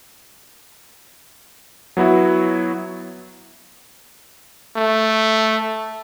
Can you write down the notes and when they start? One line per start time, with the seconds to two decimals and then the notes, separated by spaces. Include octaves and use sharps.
1.97 F#3 B3 E4 F#4
4.76 A3